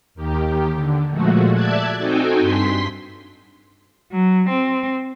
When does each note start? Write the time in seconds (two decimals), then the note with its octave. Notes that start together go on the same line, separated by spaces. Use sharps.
0.15 D#2 D#3 G4
0.73 D3
1.10 A#2 F3 G#3 A3 F#4
1.52 D5 E5 A5 F#6 G#6
1.96 C4 D#4 F#4 A4 G5 G#5
2.39 G2 C6 B6
4.12 F#3
4.49 C4